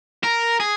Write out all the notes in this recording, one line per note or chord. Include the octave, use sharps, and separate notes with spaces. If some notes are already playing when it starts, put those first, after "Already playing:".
A#4
G#4